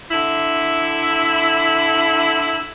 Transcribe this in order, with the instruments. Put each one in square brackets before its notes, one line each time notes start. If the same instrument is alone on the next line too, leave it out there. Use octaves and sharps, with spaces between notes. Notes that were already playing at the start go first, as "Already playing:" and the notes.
[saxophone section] D3 E4